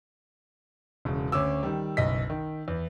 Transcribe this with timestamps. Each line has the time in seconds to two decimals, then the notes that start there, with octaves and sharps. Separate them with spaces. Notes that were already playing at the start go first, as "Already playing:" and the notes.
1.05 E1 C#3
1.32 D2 C#4 D6 E6
1.63 D#3 G3
1.97 F#1 B1 D#5 B6
2.30 D#3
2.68 E2